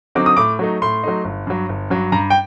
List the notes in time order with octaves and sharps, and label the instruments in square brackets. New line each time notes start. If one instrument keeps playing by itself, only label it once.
[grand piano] D3 F#3 C4 D#4 D6
D#6
A2 D6
F#3 A3 D#4
A2 C6
F#3 A3 D#4
G1
G2 F#3
G1
G2 F#3
G2 A#5
G5